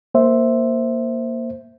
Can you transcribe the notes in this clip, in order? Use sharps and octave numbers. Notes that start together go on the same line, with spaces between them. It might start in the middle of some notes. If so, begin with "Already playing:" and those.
A#3 C5 E5